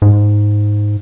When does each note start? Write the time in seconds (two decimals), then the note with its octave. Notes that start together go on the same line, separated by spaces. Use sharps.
0.02 G#2